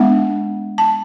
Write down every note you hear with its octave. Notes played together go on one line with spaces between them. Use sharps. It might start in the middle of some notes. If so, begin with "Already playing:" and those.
Already playing: G#3 B3 D4 F#5
A5